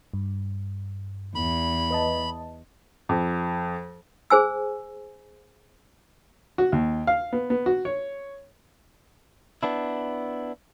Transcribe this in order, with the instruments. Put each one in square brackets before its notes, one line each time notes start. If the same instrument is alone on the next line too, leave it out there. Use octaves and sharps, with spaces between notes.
[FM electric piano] G2
[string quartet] E2 [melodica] B5
[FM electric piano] B4 D#5 A5
[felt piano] F2
[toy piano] G#4 C5 G#5 E6
[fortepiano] F#4
D#2
F5
B3
B3
F#4
C#5
[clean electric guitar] B3 D4 E4